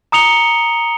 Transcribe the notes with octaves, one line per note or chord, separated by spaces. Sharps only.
A#5 D#6 C#7 F7 G7